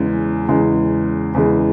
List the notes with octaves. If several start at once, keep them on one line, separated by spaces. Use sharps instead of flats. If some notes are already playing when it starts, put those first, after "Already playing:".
Already playing: E2 C#3 G#3
E2 C#3 G#3
E2 C#3 G#3